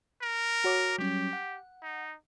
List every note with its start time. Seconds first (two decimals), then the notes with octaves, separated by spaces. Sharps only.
0.22 A#4
0.64 F#4 C#5 D6
0.98 F#3 G3 C#4 G4
1.33 F#5
1.83 D#4